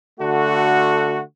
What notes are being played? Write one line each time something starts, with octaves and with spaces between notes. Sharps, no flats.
D3 A3 F#4